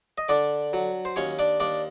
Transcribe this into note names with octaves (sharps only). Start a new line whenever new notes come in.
D#5
D3 D4 D5
F#3
C5
D#2 C#4 C#5
D4 D5
D#2 D4 D5